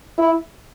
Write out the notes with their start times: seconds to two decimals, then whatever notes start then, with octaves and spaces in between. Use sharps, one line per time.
0.18 E4